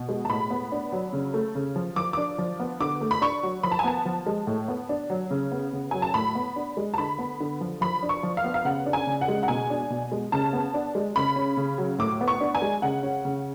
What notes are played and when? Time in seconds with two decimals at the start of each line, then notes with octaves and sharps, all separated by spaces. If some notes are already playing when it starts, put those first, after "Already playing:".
Already playing: B2
0.09 G#3
0.25 A5
0.30 A2 B5
0.50 B3
0.72 D4
0.92 F#3
1.13 C#3
1.34 A3
1.55 C#3
1.76 F3
1.96 F3 D6
2.13 D4 D6
2.38 F3
2.60 B3
2.81 D3 D6
3.01 A3
3.11 B5
3.21 D4 C#6
3.43 F#3
3.63 F3 B5
3.71 A5
3.79 G#5
3.84 B3 A5
4.06 F3
4.26 G#3
4.47 A2
4.68 B3
4.89 D4
5.10 F#3
5.31 C#3
5.52 B3
5.73 C#3
5.91 F#3 G#5
6.02 A5
6.14 A2 B5
6.35 B3
6.56 D4
6.77 G#3
6.94 A5
6.98 D3 B5
7.19 B3
7.40 D3
7.61 F3
7.81 F3 B5
8.03 D4
8.09 C#6
8.23 F3
8.37 F5
8.44 B3
8.54 F5
8.65 C#3 F#5
8.86 D4
8.93 G#5
9.07 C#3
9.21 F#5
9.28 G#3
9.43 F#5
9.48 B2 G#5
9.70 D4
9.90 B2
10.12 G#3
10.32 C#3 A5
10.53 B3
10.74 D4
10.95 G#3
11.16 C#3 B5
11.36 C#4
11.57 C#3
11.78 F#3
11.99 A2 D6
12.21 B3
12.28 C#6
12.40 D4
12.55 G#5
12.62 G#3
12.82 C#3 F#5
13.03 C#4
13.25 C#3